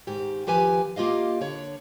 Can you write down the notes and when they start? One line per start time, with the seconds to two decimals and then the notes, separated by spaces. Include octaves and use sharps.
0.07 G#2 D#3 G4
0.47 D#2 F3 G4 B4 G#5
0.96 A#3 F4 G4 D#5 F5
1.41 D3 C#5